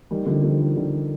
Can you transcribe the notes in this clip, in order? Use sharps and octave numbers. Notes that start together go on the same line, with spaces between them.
D#3 G3
D3 F3
D3 F3
D#3
D3